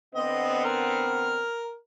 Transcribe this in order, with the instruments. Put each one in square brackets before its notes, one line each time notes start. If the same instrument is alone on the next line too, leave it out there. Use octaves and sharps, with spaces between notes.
[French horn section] D3 B3 C4 [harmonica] D#5
[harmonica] A#4 F6